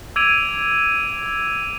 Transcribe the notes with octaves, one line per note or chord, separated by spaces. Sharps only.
D6 E6 G#6 D7 D#7 F7